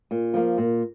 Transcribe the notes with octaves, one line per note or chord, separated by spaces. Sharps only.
A#2
F3 A#3
A#2